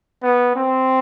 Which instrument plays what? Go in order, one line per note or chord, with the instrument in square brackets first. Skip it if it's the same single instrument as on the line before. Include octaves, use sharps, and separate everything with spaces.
[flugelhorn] B3
C4